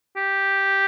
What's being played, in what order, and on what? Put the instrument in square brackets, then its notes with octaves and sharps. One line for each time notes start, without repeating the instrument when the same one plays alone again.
[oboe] G4